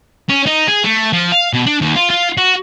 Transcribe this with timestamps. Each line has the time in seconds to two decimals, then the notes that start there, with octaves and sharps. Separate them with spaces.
0.29 C#4
0.46 D#4
0.68 G#4
0.84 A3
1.13 F3
1.32 F5
1.53 B2
1.66 D4
1.81 D#2
1.96 F4
2.10 F4
2.38 F#4